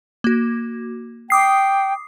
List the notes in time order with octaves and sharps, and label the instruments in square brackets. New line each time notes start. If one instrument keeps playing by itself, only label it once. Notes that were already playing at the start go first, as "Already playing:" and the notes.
[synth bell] A#3 F#4
[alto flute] G5 [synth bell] D6 D#6 C7